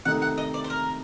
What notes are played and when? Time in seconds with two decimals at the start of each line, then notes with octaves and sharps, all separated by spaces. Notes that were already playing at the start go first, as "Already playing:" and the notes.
0.05 C3 D#3 A3 D#4 F#5
0.22 F#5
0.38 D#5
0.54 D5
0.64 C5
0.70 A#4